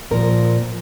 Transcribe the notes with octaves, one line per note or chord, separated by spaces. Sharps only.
A#2 F3 A#4